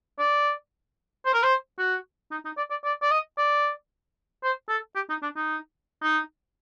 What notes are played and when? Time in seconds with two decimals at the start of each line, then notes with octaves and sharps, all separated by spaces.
0.19 D5
1.26 C5
1.34 A#4
1.43 C5
1.79 F#4
2.32 D#4
2.45 D#4
2.57 D5
2.70 D5
2.84 D5
3.02 D5
3.11 D#5
3.38 D5
4.44 C5
4.69 A4
4.95 G4
5.10 D#4
5.23 D4
5.36 D#4
6.02 D#4